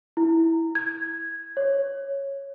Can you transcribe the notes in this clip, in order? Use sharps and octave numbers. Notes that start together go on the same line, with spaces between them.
E4
G#6
C#5